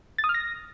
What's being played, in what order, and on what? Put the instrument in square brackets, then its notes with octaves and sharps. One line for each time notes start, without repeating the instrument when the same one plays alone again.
[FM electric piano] A6
D#6
F6
A#6